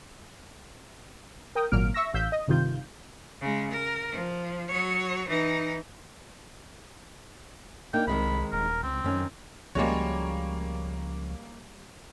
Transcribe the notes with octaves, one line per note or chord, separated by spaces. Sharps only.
A#4 G5 D#6
G#1 A#2 F#3 A#3 F6 D7
E5 C#6 E6 A#6
A1 F5 E6 G6 B6
D#5
G1 C3 D#3 F4 G6
C#3 G#3
A#4
F3
F#3 C#5
E3 D#4
A#3 D4 D#4 G5
C2 D#3 G#3 C4 B5
D#1 A#4
C#2 C4
F#2 D#3 C#4
C#2 F3 G3 G#3 A#3 C#4 F#4 C#5